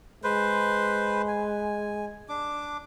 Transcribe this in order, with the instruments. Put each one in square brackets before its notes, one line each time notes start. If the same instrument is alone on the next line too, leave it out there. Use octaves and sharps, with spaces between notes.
[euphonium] G#3 [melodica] B4 C5
[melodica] G#5
D4 D6